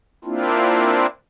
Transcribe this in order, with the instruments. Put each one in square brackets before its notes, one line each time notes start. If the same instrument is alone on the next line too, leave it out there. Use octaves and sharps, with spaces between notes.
[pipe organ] A#3 C4 D4 E4 F4